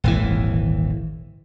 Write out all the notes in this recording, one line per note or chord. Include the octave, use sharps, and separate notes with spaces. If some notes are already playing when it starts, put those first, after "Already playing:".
D#1 G#1 E3